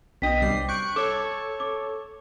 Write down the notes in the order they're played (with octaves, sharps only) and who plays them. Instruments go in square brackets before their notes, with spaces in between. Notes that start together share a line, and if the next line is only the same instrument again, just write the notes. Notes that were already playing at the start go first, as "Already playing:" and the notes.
[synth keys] B1 D#5 [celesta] D4 G5 B6
[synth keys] C2 G3 C7
[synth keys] C#6 F#6 D7 [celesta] G6
[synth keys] A4 C#5 [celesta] D6
[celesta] D6